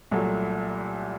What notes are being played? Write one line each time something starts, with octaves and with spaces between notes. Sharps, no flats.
C2 A#2 F#3 A3